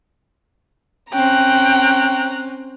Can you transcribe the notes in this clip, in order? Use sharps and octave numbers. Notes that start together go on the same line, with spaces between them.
C4 C#4 G5 A#5 F#6